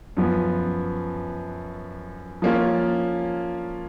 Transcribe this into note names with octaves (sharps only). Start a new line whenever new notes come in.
F#2 F3 B3
F3 A#3 C#4 F4